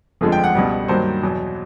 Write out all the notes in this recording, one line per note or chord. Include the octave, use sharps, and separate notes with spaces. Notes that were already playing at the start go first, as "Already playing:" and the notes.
G1 F2 D3 F3 G#3
G5
F#5
C#2 B2 G3
G2 D#3 F#3 A#3 C5
E2 B2 F#3